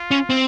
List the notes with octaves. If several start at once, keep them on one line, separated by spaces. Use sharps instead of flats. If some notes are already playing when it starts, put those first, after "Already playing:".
Already playing: F4
C#4
C4